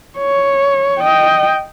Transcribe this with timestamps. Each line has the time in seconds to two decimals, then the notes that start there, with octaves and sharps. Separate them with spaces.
0.18 C#5
1.00 D#5 G5